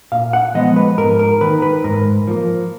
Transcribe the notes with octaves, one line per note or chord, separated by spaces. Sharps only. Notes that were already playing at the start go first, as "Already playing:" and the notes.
A#2 F5
F#5
F3 G#3 B3 D#5
B4
G#2 A#4
A#4
D#3 A#3 B4
B4
G#2 A#4
F3 A#3